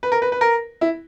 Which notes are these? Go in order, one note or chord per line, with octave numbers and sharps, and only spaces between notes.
B4
A#4
B4
B4
A#4
E4